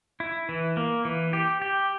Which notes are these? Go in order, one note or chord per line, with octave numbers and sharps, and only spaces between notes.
E4
E3
A#3
E3
G4
G4